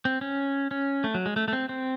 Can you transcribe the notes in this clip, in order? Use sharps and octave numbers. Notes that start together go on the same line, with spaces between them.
C4
C#4
C#4
A3
F#3
G#3
A3
A3
C4
C4